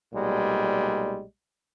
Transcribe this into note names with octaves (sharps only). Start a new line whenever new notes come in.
B1 A#2 G3 G#3